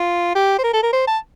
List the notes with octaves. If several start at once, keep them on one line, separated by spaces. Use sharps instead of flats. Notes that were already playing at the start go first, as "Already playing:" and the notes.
Already playing: F4
G4
C5
A#4
A4
A#4
C5
A5